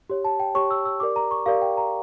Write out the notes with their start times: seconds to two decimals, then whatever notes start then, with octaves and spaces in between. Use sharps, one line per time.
0.10 G4 C#5
0.25 A5
0.40 G5
0.55 G4 C#5 C#6
0.71 E6
0.85 E6
1.00 G4 A#4 D5 D6
1.16 A#5
1.31 C#6
1.46 G4 A#4 D5 F5
1.62 G5
1.77 A#5